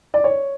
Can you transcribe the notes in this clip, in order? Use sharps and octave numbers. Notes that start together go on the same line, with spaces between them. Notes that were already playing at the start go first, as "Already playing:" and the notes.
D5
C#5